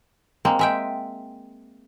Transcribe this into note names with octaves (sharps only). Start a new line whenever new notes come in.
G#3 A#3 C4
G#3 E5 G5